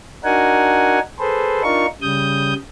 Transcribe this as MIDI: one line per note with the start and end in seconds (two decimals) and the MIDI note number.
0.24 0.99 62
0.24 0.99 63
0.24 0.99 66
0.24 0.99 70
0.24 0.99 78
0.24 0.99 80
1.19 1.63 68
1.19 1.63 69
1.19 1.63 71
1.19 1.63 72
1.63 1.86 62
1.63 1.86 63
1.63 1.86 65
1.63 1.86 70
1.63 1.86 85
2.02 2.54 49
2.02 2.54 55
2.02 2.54 87
2.02 2.54 91